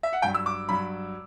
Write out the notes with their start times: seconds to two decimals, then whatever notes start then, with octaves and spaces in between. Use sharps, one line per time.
0.03 E5
0.13 F#5
0.22 G2 F#3 G5
0.34 E6
0.46 D6
0.69 G2 F#3 B5